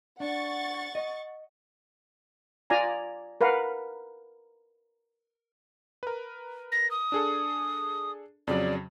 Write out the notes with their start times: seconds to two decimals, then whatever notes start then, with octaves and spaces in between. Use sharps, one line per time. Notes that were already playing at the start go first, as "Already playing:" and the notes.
0.20 D4 F#5 C#6 A6
0.95 D#5
2.70 F4 D5 G#5 A#5
3.41 A#4 B4 F5 F#5
6.03 A#4 B4
6.72 A#6
6.91 D#6
7.12 D4 G#4 A4
8.47 F2 C#3 F#3 D5